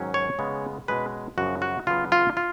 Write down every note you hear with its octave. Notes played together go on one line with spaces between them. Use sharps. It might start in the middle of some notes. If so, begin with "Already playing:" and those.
Already playing: G#2 D#3 F#3 C#4
C#5
C#3 G#3 B3
B2 G#3 C#4 B4
F#2 C#3 F3 F#4
F#4
C#3 F#3 B3 F4
F4
F4